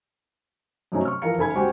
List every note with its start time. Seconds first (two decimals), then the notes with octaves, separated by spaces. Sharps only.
0.92 F#2 C3 F#3 A3 C#4 D#4
1.05 C#6 F6
1.22 E3 F3 A#4 F5 C#7
1.37 F#1 D#3 A4 G#5 B5 G#6
1.55 C#2 F#4 G4 C5 G#5